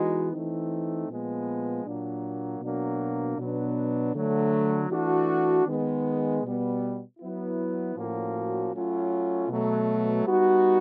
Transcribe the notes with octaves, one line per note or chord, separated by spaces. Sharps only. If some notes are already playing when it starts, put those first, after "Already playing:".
Already playing: E3 G#3 B3 D#4 F#4
E3 A3 C4 D#4
A#2 F3 G#3 B3
A#2 F#3 A#3 D4
B2 F#3 A#3 D4
B2 F#3 B3 D4
D3 F#3 A3
E3 A3 D4 F#4
D#3 G#3 B3
B2 G3 B3
F#3 B3 E4
A2 F3 A#3 C#4 F#4
F#3 A3 C#4 F4
B2 F#3 A3
G3 B3 D#4 F#4